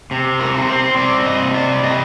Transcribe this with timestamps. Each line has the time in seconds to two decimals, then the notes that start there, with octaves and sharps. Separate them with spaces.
0.11 C3
0.40 A#4
0.55 C4
0.68 C5
0.96 C4 D5
1.25 D#5
1.40 C3
1.54 D5
1.83 C3 D#5